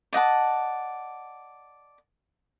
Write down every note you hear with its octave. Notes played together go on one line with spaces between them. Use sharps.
D5 D#5 F#5 A5